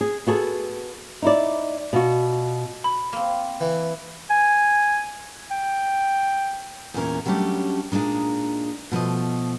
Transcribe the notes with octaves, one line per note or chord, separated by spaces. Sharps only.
G#4
B3 F#4 G#4 A4
D#4 E4 D5
B2 F4 F#4
B5
A#3 C4
E3
G#5
G5
E2 A#2 C#4 A#4
F#3 G3 A3 C#4 D4 G4
A#2 G#3 D4 D#4
B2 F3 A3 D#5